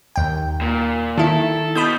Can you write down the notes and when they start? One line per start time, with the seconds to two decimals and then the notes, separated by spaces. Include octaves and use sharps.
0.16 D#2 G5
0.61 A#2
1.18 D#3 E4 A4
1.75 B2 B5 D#6 G6